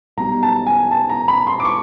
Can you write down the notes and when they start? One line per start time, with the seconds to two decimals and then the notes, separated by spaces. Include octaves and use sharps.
0.17 B1 B2 G3 A#5
0.43 A5
0.66 G#5
0.91 A5
1.09 A#5
1.28 B5
1.47 C6
1.60 D6
1.65 C#6